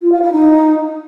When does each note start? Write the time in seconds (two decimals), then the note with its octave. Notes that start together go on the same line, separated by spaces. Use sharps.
0.02 F4
0.12 F5
0.22 E4
0.32 D#4